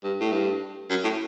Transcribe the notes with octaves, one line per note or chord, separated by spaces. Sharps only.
G2
A2
G2
F#2
A2